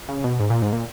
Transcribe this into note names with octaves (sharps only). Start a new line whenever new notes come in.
C#3
B2
G#2
A#2
G#2
A#2